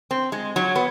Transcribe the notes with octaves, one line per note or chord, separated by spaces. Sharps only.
C4
G#3
F#3
B3